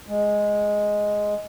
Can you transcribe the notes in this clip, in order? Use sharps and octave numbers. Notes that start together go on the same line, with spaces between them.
G#3